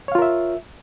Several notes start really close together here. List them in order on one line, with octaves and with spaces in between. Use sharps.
C#5 F5 F4 A#4 E5